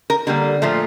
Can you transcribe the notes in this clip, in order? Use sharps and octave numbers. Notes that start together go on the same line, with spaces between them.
A#4
D3 G3 A#3
A#2 F3 A3